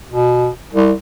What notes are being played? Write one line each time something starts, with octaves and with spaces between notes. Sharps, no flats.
B2
C2